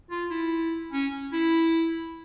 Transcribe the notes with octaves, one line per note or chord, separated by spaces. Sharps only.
F4
E4
C#4
E4